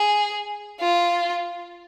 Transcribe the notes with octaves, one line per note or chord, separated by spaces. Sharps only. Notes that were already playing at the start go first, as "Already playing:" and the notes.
Already playing: G#4
F4